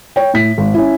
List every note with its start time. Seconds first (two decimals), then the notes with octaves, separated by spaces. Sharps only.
0.16 C#5 G5
0.34 A2 B6
0.58 G#1
0.74 C#4 E4